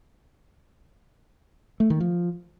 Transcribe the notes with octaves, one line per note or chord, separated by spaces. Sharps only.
A3
D#3
F3